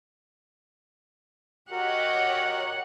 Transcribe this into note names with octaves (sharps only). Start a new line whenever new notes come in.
F#4 G4 A#4 C#5 D#5 F#5